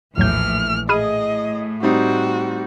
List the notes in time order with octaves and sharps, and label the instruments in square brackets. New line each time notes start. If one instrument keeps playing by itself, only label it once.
[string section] A#1 A2 E3 [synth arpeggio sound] E2 F#3 G6 [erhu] F6
[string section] A2 [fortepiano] G#4 [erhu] D#5 [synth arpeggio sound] B5 F6 D#7
[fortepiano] G3 C4 D#4 [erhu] F#4